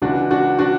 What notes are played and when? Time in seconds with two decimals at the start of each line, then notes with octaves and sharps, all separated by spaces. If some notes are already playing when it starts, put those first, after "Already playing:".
0.02 C#2 C#3 E3 D4 F#4
0.31 D4 F#4
0.59 D4 F#4